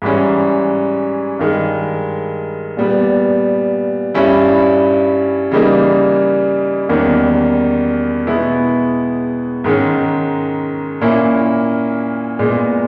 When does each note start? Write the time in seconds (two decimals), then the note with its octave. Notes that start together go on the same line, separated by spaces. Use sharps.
0.02 G#2 E3 G3 C#4
1.39 G2 D#3 G#3
2.77 A#2 G3 B3
4.14 G2 G3 C#4 E4
5.51 C#3 E3 G3 A#3 D#4
6.89 E2 D#3 G3 A#3 C#4
8.27 B2 G#3 B3 E4
9.64 G#2 D#3 G#3 C#4
11.01 A#2 A#3 C#4 E4
12.39 A#2 G#3 B3